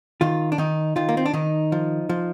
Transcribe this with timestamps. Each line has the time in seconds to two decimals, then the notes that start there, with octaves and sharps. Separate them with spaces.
0.21 D#3 F4
0.52 D4
0.58 D#3 D#4
0.96 D#3 F4
1.09 A#3
1.17 C4
1.26 D4
1.33 D#3 D#4
1.72 F3
2.09 F3